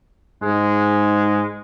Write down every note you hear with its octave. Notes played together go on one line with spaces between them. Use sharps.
G#2 G#3